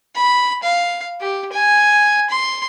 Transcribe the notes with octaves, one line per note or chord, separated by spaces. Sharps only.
B5
F5
G4
G#5
C6